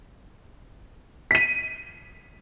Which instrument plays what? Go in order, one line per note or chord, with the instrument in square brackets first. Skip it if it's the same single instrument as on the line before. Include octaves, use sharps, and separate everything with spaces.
[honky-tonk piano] B6 D#7